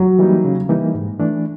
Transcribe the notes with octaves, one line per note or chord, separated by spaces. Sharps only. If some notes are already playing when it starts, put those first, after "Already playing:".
Already playing: F#3
E3 G3 A#3 D#4
C#3
E3 G3 A#3 D#4
G#2
E3 A3 D4